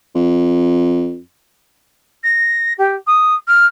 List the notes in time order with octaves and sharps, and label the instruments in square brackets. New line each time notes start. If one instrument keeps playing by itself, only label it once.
[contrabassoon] F2
[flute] A#6
G4
D#6
F6